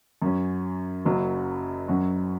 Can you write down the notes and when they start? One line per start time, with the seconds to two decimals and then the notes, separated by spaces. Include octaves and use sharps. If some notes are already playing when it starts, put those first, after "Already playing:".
0.22 F#2 F#3 C#4
1.05 F#1 F#2 C#3 F#3
1.88 F#2 F#3 C#4 F#4